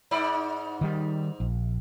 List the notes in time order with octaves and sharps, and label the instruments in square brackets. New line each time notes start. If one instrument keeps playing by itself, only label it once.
[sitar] G#2 D#4 D5
[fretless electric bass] D#3 G3
A#1